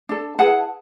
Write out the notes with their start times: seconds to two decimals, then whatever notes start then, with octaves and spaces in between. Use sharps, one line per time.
0.09 D4 A4
0.38 E4 G#4 B4 F#5 A5